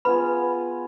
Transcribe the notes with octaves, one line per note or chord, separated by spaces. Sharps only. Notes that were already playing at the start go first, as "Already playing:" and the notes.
B3 F4 G#4 B4 B5